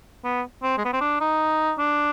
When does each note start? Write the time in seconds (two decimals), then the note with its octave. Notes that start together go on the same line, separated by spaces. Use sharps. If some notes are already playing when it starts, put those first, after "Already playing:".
0.24 B3
0.63 C4
0.78 G#3
0.85 B3
0.93 C4
1.01 D4
1.21 D#4
1.78 D4